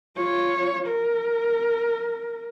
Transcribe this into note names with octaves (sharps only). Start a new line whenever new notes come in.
F4 C#5
A#4